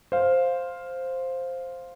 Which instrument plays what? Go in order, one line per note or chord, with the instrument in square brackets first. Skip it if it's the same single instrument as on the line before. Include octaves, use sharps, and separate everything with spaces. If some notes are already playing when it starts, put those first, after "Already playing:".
[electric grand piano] C5 F5